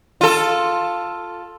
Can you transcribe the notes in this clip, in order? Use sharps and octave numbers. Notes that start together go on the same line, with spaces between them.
F4 A4